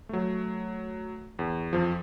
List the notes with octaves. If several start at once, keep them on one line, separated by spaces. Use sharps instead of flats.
F#3 A3
E2
F2 F3